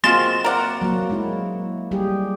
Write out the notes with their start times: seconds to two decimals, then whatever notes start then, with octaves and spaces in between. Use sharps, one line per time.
0.04 G#3 A#3 C4 F4 F#4 C6 A6 E7
0.44 A#4 D5 F#5
0.81 F#3 A#3 F#4
1.10 G#3 A#3 E4
1.91 G3 G4 G#4